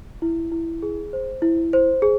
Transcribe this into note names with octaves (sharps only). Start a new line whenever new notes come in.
E4
E4
G#4
C5
E4
C5
G#4